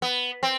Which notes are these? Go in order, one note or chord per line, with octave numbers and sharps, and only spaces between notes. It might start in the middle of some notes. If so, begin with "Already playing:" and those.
B3
C4